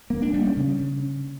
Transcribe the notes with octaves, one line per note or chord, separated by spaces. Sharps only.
A#3
D4
G3
C#4
C#3